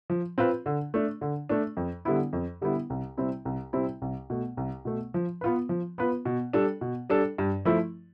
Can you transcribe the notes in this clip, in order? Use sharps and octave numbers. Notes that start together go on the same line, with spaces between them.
F3
C4 F4 B4
D3
A3 D4
D3
A3 D4
F2
D3 G3 B3 E4
F2
D3 G3 B3 E4
C2
C3 G3 C4 E4
C2
C3 G3 C4 E4
C2
B2 A3
C2
B2 A3
F3
B3 F4 B4
F3
B3 F4 B4
B2
G3 D4 A4
B2
G3 D4 A4
G2
F3 A3 E4